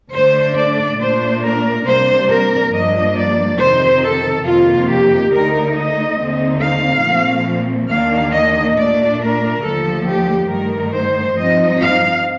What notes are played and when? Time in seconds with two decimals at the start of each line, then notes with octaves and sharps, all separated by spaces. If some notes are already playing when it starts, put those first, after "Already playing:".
0.12 D3 A3 D4 C5
0.56 D5
0.99 A#2 A3 D4 C5
1.42 A#4
1.85 C3 G3 A#3 D4 C5
2.28 A#4
2.71 G2 F3 A#3 D4 D#5
3.15 D5
3.58 F2 C3 D#3 C5
4.01 A4
4.45 F2 C3 D#3 A#3 F4
4.88 G4
5.31 D2 D3 A3 D#4 A#4
5.74 D#5
6.17 D#2 D3 A3 C4 D#4
6.60 F5
7.04 A#2 F3 A3 C4
7.90 D#2 D#3 A#3 D4 F5
8.34 D#5
8.77 A#2 A3 D4 D5
9.20 A#4
9.63 D#2 D3 F3 A3 A4
10.06 G4
10.50 G2 D#3 A3 A#4
10.93 C5
11.36 G2 F3 C4 D#4 D#5
11.80 F5